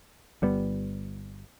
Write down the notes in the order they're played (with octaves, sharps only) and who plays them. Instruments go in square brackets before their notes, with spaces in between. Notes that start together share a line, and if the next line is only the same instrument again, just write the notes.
[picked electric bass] G1 G3 B3